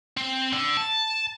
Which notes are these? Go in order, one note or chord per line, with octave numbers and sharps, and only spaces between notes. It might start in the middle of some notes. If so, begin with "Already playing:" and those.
C4
D3
A5